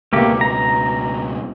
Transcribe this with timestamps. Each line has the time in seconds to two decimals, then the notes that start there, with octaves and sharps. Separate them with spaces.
0.13 C#2 B2 A3 A#3 G4
0.41 A#5